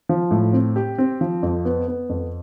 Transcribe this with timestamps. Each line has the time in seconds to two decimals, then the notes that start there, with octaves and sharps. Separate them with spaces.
0.09 F3
0.31 A2
0.53 C4
0.76 G4
0.98 C4
1.21 F3
1.43 F2
1.65 B3
1.88 B3
2.09 F2